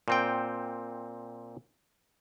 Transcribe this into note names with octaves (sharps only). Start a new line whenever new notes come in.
A#2 C4 G5